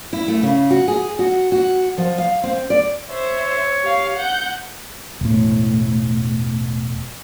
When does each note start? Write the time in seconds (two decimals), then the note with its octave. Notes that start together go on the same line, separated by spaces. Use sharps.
0.13 E4
0.28 A3
0.43 C#3
0.71 F#4
0.88 G#4
1.19 F#4
1.52 F#4
1.98 F3
2.18 F5
2.44 C4
2.70 D5
3.09 C5 C#5 E5
3.83 G4 F5
4.17 F#5 G6
5.21 E1 A2